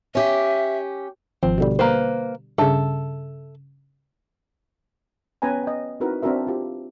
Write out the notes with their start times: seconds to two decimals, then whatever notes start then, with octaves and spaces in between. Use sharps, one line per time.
0.15 C#4 G4 E5
1.43 G#1 F3 C4
1.58 B2 D3 G3
1.79 A#3 B4 C5
2.58 G2 C#3 A4 E5
5.42 B3 C#4 B4 G5 G#5 A#5
5.64 D#5 G5
6.00 C4 D#4 E4 F#4 A#4 B4
6.22 C4 D4 F#4 A#4 E5
6.47 F4 G4